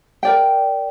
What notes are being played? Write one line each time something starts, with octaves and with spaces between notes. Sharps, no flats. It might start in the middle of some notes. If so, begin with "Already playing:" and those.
A#4 D5 G5